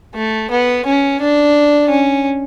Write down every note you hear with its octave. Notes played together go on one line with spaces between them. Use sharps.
A3
B3
C#4
D4
C#4